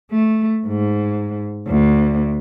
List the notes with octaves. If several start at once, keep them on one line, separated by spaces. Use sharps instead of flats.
A3
G#2
D2